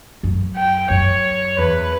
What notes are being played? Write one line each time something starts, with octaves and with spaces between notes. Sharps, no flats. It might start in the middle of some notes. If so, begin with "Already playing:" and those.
F#2
G5
F#2 C#5
E2 B4